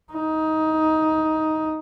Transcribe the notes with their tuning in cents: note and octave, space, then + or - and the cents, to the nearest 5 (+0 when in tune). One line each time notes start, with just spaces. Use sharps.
D#4 +15